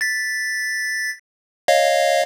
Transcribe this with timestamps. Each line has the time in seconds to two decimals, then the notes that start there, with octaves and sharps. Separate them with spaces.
0.01 A6 B6
1.68 C#5 D#5 F5